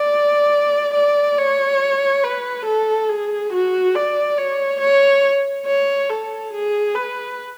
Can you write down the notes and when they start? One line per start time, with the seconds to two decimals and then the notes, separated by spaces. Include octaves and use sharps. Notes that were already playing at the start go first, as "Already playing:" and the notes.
Already playing: D5
0.94 D5
1.38 C#5
2.24 B4
2.66 A4
3.09 G#4
3.53 F#4
3.95 D5
4.38 C#5
4.81 C#5
5.66 C#5
6.10 A4
6.53 G#4
6.95 B4